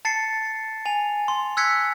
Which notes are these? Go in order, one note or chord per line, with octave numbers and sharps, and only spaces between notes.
A5 A6 C7 C#7
G#5 F7
C6
E6 F#6 G#6 B6 C#7